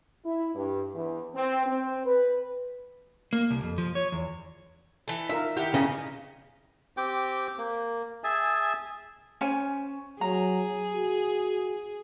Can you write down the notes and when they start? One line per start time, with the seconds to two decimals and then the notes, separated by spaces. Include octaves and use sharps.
0.25 E4
0.55 G2
0.94 E2
1.35 C4
1.66 C4
2.06 B4
3.33 A#3
3.51 C2
3.63 F2
3.78 F3
3.95 C#5
4.12 E2
5.08 E3 A4
5.29 D#4 F4 A#4 E5
5.57 D#3 E4 G4 F#5
5.74 C#3 D#5 G#5 A#5
6.97 C4 G4 G5 D6
7.58 A#3
8.24 G#4 E5 G#5 A5
9.41 C#4 C5 G#5
10.21 F#3 G#4 A#5
10.93 F#4